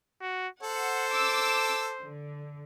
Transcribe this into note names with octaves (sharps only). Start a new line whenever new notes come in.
F#4
A4 C5 F#5
D6 E6
D3